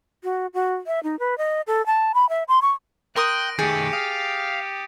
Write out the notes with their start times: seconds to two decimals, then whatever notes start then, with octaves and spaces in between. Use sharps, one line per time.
0.23 F#4
0.54 F#4
0.87 E5
1.03 D#4
1.19 B4
1.38 D#5
1.67 A4
1.86 A5
2.14 B5
2.29 E5
2.48 C6
2.62 C#6
3.16 A#4 G5 C6 D#6 F#6 A#6 D7 D#7
3.59 D#3 A3 G4 G#4 G6 A6 C#7
3.93 F5 D#6